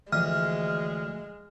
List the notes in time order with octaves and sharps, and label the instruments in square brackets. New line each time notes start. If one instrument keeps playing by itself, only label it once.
[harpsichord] D2 [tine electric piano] E3 F3 [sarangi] G#3 [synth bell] F6